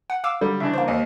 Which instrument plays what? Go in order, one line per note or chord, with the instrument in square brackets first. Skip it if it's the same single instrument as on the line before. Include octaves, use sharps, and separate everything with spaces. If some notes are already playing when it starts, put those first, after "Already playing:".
[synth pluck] F#5
F5 D6 E6
[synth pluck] D3 F#3 [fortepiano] G3
[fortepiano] C#3 E3 D4 [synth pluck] E5
[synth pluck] A#3 C5
[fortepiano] D#2 D#5